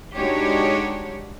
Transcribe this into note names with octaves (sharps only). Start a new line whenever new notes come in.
G#3 D4 D#4 F#4 G4 C#5